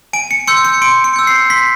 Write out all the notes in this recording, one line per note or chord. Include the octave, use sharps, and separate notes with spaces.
G#5 D7
C#7
C6 E6 G6 C#7
C#7
C6 D7
C#7
E6 G6
C7
C6 B6